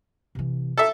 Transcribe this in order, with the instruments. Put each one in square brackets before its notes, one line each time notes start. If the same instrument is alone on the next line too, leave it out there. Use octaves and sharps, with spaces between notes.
[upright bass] C3 E3
[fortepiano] A4 E5